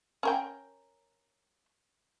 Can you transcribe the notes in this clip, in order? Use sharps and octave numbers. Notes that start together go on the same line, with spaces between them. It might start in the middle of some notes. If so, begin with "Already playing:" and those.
C#4 A#4 G5